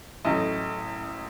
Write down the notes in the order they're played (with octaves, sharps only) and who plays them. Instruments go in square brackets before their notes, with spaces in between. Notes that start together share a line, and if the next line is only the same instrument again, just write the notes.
[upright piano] A1 A2 F#3 D#5